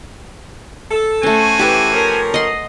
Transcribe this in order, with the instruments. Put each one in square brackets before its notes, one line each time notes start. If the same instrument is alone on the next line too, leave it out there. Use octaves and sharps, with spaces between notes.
[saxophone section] A4
[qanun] A3 C#4 [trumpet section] F#4 C5 G#5
[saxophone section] E3 [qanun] G4 A4 B4
[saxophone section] F3 C#4 A#4
[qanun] D#5 F#5 C6